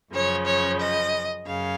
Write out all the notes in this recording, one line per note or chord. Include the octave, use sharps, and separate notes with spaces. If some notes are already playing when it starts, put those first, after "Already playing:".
F#2 C#3 F3 C#5
C#5
D#5
F#2 C#3 F5